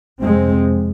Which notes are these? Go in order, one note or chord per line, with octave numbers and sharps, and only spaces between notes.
F2 C3 G#3 C4